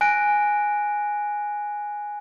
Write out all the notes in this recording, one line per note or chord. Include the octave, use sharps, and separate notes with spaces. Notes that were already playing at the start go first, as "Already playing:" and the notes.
G#5 F#6 A#6 D7